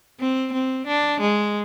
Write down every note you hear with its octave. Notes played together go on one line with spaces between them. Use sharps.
C4
C4
D4
G#3